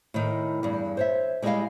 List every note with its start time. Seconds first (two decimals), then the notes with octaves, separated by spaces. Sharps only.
0.14 A2 D#3
0.63 E2 G2
0.97 C5 C#5 E5
1.42 G3 G#3 B3 E4 D#5 F5